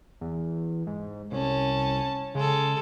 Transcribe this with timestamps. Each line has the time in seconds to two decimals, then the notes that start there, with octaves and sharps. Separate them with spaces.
0.21 E2
0.87 G#2
1.32 C2 C#4 A5
2.35 C#3 G#3 A4